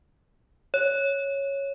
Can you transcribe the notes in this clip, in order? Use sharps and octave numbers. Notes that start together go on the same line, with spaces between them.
C#5